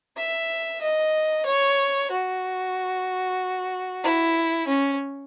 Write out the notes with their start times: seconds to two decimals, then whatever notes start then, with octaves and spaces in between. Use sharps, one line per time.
0.17 E5
0.81 D#5
1.46 C#5
2.11 F#4
4.04 E4
4.67 C#4